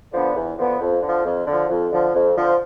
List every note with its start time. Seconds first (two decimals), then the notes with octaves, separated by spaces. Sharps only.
0.13 D3 F3 B3 D4
0.36 E2
0.58 D3 F3 B3 D4
0.80 F2
1.02 D3 F3
1.25 F2
1.47 D3 F3
1.69 F2
1.92 D3 F3
2.14 F2
2.36 D3 F3